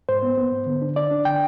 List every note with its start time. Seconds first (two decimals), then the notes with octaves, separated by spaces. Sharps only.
0.09 G#2 C5
0.23 B3
0.38 B3
0.52 G#2
0.66 D3
0.82 D4
0.96 D4 D5
1.11 D4
1.25 D3 G5